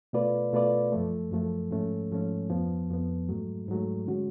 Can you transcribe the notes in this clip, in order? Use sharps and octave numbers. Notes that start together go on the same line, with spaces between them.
B2 A3 F4 B4 D5
B2 A3 F4 B4 D5
F#2 F3 A3
F#2 F3 A3
G#2 F3 A3 C#4
G#2 F3 A3 C#4
F2 F3 B3
F2 F3 B3
G#2 F#3 A3
G#2 F#3 A3
D3 G#3 C#4 F#4